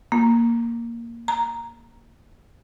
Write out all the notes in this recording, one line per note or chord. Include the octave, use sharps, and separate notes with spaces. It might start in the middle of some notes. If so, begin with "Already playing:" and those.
A#3
A#5